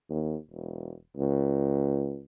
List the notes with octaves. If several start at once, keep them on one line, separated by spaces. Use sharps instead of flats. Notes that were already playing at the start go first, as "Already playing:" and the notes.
D#2
E1
C#2